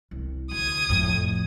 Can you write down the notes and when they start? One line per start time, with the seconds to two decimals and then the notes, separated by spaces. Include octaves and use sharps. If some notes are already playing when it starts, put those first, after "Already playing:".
0.11 C2
0.51 D2 D#6 G#6
0.89 F2 A2